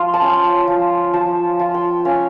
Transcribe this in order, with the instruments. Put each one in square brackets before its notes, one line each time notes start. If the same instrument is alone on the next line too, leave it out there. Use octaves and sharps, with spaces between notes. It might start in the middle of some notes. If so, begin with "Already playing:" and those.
Already playing: [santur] F3 F4 F5
A5
C#4 G5
F3
F3 A5
F4
G5
C#4 F5